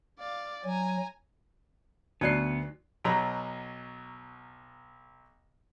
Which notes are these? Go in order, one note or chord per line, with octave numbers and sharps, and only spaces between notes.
D5 F5
F#3 G#5 A#5
D2 F#3 B3 D#4 D5 F#6 C7
B1 B2 F#3 A#5 B5